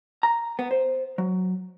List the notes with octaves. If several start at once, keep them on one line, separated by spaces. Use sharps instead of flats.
A#5
B3
C5
F#3